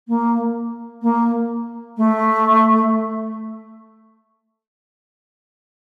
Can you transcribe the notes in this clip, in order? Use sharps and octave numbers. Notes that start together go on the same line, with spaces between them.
A#3
A#3
A3